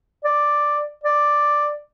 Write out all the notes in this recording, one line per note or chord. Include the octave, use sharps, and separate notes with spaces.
D5
D5